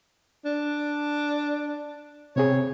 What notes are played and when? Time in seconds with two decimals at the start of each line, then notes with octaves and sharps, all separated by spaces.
0.45 D4
2.36 C3 C4 G#4 C#5